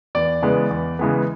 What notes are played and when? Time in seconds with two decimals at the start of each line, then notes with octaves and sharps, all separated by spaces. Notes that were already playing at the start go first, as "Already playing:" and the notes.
0.15 E2 D5
0.42 C#3 E3 G#3 B3
0.71 E2
0.99 C#3 E3 G#3 B3